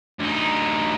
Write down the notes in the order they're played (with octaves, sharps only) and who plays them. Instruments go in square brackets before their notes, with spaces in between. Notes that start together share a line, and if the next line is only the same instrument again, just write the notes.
[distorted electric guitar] D2 D#4